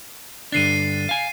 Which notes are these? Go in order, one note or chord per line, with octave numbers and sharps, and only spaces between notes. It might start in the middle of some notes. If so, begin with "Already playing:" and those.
G2 D3 D4 A6 C7 D#7
F5 G#5